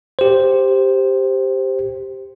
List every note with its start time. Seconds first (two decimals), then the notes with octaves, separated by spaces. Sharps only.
0.19 G4 C5